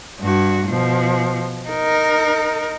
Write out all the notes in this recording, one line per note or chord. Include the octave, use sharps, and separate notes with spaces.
G2 F#4
B2 F3
D#4 A#4